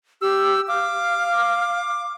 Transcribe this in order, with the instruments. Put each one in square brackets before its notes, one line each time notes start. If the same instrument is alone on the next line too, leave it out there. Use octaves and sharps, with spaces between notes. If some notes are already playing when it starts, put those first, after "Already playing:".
[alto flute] G4 [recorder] E6
[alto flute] F5 [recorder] D6